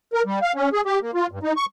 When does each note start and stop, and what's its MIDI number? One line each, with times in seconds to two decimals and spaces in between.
0.14 0.22 70
0.25 0.39 55
0.42 0.53 77
0.55 0.69 61
0.73 0.81 68
0.86 0.99 67
1.02 1.11 58
1.14 1.27 65
1.31 1.39 43
1.43 1.53 63
1.57 1.66 85